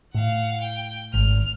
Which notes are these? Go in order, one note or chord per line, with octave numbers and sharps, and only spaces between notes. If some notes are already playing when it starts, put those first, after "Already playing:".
A2 F5 F#5
G5
G#1 F6